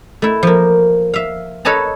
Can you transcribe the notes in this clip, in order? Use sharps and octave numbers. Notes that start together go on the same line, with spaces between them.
A3 E4
F3 A#3
E5 F5
A4 B4 C#5 D#5 A5 A#5